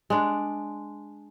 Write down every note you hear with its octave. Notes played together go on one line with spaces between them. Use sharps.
G#3 D4